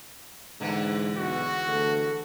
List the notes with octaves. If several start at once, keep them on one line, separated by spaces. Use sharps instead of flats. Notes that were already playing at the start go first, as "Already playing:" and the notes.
E2 G#2 D3 E3
B1 F#4
D2 A4